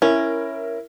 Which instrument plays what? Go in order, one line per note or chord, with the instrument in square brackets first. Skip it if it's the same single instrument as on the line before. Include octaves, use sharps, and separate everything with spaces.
[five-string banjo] C#4 [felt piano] E4 A#4